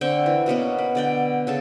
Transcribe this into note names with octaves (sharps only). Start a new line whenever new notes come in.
D3 C4 G5 C#6
E3
B2 A#3 B3 C#4
B4
D3 D5 G5
C#3 A4 A5